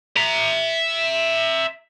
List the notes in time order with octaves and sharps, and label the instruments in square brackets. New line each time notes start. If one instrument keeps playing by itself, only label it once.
[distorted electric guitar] E5 A#5